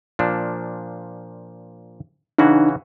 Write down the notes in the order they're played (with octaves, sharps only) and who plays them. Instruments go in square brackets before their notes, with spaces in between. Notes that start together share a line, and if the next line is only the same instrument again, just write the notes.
[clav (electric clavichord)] A#2 F3 D4
[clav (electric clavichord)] C#3 E3 F#4 [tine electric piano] D4 D#4